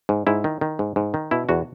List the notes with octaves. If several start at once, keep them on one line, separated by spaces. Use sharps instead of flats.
G#2
G#2 E4
D#3
D#3
G#2
G#2
D#3
B2 E4
E2 F#4